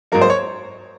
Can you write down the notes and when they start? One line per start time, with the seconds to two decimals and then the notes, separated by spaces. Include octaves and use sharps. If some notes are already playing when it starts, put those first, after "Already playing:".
0.12 G#2 F#3 A#3 A#4
0.21 C5
0.30 C#5